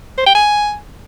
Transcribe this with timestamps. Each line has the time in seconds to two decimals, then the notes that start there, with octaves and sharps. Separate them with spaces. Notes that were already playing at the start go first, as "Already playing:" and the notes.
0.18 C5
0.26 G5
0.35 G#5